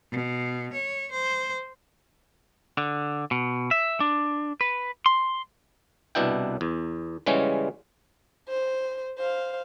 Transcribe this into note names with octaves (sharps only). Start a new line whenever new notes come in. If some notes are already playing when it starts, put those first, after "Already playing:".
B2
C#5
C5
D3
B2
E5
D4
B4
C6
C2 B2 D4 E4 G5
E2
C#3 E3 G3 G#3 C#4
C5
C5 F5